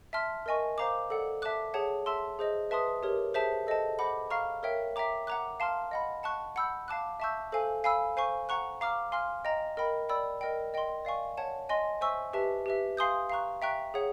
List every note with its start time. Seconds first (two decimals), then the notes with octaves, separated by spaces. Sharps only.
0.13 E5 A5 C6 F6
0.46 A#4 D#5 G#5 C#6
0.78 C5 F5 A#5 D6
1.10 A4 D5 F#5
1.42 E5 A5 D6 F#6
1.74 G#4 C#5 F#5 A5
2.06 E5 A5 C6 E6
2.39 G#4 C5 D#5
2.71 B4 E5 A5 C6 D#6
3.03 G4 A#4 C#5
3.34 G#4 C5 E5 A5
3.67 A4 C5 D#5 F#5 A5
3.99 C5 D#5 F#5 B5 D6
4.30 F5 A#5 C#6 F6
4.63 A#4 C#5 E5 G5
4.96 E5 G5 A#5 D6
5.27 F#5 A#5 D6 F#6
5.60 F5 A5 C6 F6
5.91 D#5 F#5 B5
6.23 F#5 A5 C#6 F#6
6.56 F#5 B5 E6 G6
6.88 F5 A5 D6 F#6
7.20 E5 A5 C#6 E6 G6
7.52 A4 C5 F5 G#5
7.84 F5 G#5 B5 E6
8.17 C5 F5 G#5 C#6
8.49 F#5 A#5 C#6 F#6
8.81 F5 A#5 D6 F6
9.12 F5 G#5 C6 F6
9.45 D#5 G5 A#5
9.77 A#4 D#5 G5 B5
10.09 D5 G5 B5 E6
10.41 A#4 D#5 G5
10.74 D#5 G5 C6
11.05 D5 F5 G#5 C#6
11.38 C#5 F#5 A5
11.69 D#5 G#5 C6
12.01 C5 E5 G#5 C#6 E6
12.33 G4 B4 E5 A5
12.66 G4 B4 E5
12.97 F5 G#5 C6 D#6 G6
13.30 F5 A#5 C#6 F#6
13.62 E5 G5 A#5 C#6 F#6
13.94 G#4 C#5 F#5